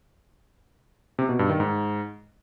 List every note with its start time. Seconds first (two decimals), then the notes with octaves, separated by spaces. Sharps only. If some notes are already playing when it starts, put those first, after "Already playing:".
1.19 C3
1.29 B2
1.39 G2
1.49 D#3
1.60 G#2